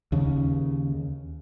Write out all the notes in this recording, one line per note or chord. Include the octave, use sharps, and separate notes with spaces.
D#2 C#3